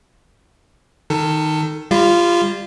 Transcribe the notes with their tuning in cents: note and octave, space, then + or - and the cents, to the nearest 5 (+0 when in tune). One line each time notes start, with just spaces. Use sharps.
D#3 +0 A4 +20
G3 +25 F4 -15